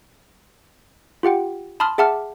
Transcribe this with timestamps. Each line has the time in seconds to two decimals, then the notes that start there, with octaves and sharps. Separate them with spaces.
1.23 F4 G4 F#5 G5
1.80 A5 B5 C6 D#6 F6
1.98 G#4 E5 F#5 A5 D6 F6